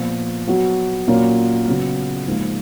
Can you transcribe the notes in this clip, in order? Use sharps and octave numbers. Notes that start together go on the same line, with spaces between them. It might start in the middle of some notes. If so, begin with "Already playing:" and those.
Already playing: A#2 F3 B3 F4
F#3 B3 F#4
A#2 F#3 A#3 C#4
C#3 F#3 B3
G#2 F3 A#3 D#4